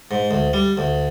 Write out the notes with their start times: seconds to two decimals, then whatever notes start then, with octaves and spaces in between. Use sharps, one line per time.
0.11 G#2
0.31 D2
0.54 G3
0.77 D2